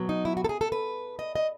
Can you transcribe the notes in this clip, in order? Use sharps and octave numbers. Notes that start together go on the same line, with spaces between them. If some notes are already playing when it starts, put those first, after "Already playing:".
Already playing: B2 F#3 B3
D#4
E4
F#4
A4
G#4
A4
B4
D#5
D#5